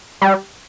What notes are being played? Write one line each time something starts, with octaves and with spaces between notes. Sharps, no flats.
G3